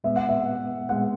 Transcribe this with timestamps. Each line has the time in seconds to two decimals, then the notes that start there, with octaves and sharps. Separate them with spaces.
0.04 A#2 G#3 B3 E5
0.16 F#5
0.29 E5
0.89 A#2 G#3 B3 F#5